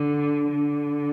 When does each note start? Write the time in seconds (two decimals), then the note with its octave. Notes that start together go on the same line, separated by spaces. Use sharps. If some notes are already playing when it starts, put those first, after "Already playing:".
Already playing: D3
0.50 D3